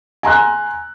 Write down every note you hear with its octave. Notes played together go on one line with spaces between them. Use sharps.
G#5 A#5 C6 F#6